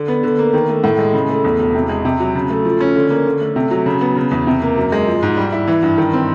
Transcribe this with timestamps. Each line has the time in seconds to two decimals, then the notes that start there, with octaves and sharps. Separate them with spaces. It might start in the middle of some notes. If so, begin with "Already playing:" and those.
Already playing: D3
0.08 B3
0.23 D3
0.38 A#3
0.53 D#3
0.69 A3
0.84 A2
0.99 G#3
1.14 C#3
1.29 A3
1.44 E2
1.59 E1
1.75 C3
1.89 G#3
2.05 C3
2.20 F#3
2.35 C#3
2.50 A3
2.65 F3
2.80 C#4
2.96 D3
3.10 A#3
3.26 D3
3.41 A3
3.56 C3
3.71 F#3
3.86 C#3
4.01 B3
4.17 C#3
4.31 E2
4.47 C3
4.62 A#3
4.77 F#2
4.92 G#3
5.08 F3
5.22 G#2
5.37 G3
5.52 E4
5.68 E3
5.83 G2
5.98 D#3
6.13 C4